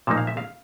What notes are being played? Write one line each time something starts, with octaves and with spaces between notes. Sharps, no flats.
A#2 F3 A#3 D#4 A5
F5
E5
F5